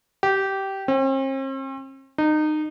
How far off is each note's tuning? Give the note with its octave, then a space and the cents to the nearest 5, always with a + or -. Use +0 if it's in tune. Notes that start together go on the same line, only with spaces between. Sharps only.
G4 -15
C4 +45
D#4 -25